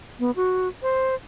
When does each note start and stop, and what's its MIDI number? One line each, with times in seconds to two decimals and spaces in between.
0.20 0.31 59
0.36 0.68 66
0.83 1.15 72